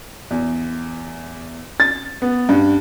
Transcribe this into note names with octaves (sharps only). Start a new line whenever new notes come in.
E2
A6
B3
G2